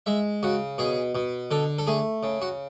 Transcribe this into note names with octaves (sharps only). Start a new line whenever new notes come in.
G#3 E5
C#3 F#4
B2 G#4
B2
D3 A4
A4
A3 G#4
C#3
F#4